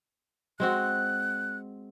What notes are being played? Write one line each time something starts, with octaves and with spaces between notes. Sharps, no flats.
G#3 C4 F#4 F#6